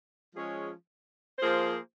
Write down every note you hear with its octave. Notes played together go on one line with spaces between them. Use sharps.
F3 G#3 C#4 G#4 C#5
F3 A#3 F4 G#4 C5